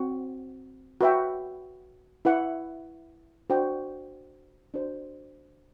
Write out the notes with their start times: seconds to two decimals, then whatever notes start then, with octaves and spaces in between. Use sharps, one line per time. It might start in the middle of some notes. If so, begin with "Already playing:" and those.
Already playing: C4 F#4
1.01 F#4 B4 E5 G5
2.25 E4 B4 F#5
3.50 D4 F#4 C5 G5
4.74 D4 F#4 C5